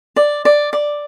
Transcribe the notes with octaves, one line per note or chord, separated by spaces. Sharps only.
D5
D5
D5